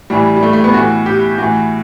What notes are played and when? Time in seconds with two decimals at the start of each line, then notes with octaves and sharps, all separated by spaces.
0.10 A2 E3 G3
0.37 G3
0.43 A3
0.53 A3
0.64 B3
0.74 A2 E3 F#4
1.06 G4
1.38 A2 E3 F#4